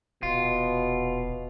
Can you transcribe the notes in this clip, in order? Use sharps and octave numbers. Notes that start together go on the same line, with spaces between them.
D#1 B2 F4